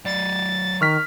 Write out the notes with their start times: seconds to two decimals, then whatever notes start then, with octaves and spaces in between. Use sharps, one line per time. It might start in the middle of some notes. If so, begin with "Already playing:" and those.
0.05 F#3 D5 A6
0.81 D#3 C#6 F6 B6